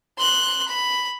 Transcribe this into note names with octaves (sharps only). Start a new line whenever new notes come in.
C6 F#6
B5